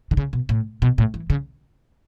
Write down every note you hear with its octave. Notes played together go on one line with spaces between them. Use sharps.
D3
C#3
B2
A2
B2
A2
E3
C#3